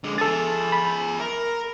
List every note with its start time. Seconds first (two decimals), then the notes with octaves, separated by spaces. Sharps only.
0.04 D3 G#3
0.18 G#4 A4 E5 A6
0.72 B5
1.20 A#4